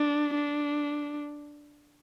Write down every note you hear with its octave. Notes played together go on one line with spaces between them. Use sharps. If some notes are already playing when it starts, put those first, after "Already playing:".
Already playing: D4
D4